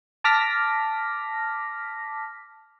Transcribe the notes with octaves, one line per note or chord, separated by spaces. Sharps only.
A5 D6 F6 A#6 B6